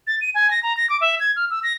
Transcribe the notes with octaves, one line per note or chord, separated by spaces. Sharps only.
A6
D#7
G#5
A#6
A#5
A#6
D6
E5
G#6
F6
E6
A#6